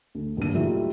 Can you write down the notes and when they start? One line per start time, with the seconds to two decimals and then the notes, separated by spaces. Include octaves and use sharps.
0.15 D2
0.37 D#1 G2 D#7
0.55 F#3 G3 A3 D#4 F4 E5